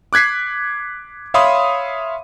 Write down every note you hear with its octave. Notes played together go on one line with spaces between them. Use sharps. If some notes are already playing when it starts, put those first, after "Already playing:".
D6 F#6 G#6 B6 C7
C#5 E5 F5 B5 C6 D#6